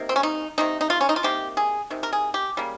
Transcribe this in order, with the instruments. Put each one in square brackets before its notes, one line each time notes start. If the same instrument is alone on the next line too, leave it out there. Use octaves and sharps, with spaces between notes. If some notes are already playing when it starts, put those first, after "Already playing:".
Already playing: [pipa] C3 D#3 A#3
C4
C#4
D#4
C3 D#3 A#3 D#4
D#4
F4
C#4
D#4
F4
C3 D#3 A#3 G4
G#4
C3 D#3
A#4
G#4
G4
C#3 G3 A#3